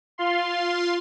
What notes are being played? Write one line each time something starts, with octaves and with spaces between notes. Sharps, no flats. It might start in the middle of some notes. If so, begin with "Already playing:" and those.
F4 F5 C6